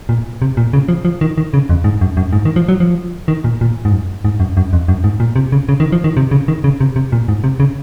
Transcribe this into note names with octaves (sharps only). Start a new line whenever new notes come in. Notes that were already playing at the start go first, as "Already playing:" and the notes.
A#2
C3
A#2
C#3
F3
F3
D#3
D#3
C#3
F2
G#2
F#2
F#2
G#2
D#3
F3
F#3
F3
D#3
A#2
A#2
G#2
F#2
G#2
F#2
F#2
F2
F#2
G#2
A#2
C3
C#3
C#3
D#3
F3
D#3
C3
C#3
D#3
C#3
C3
C3
A#2
G#2
C3
C#3